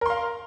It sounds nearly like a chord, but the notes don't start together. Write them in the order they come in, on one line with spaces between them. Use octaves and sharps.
A#4 C6 F5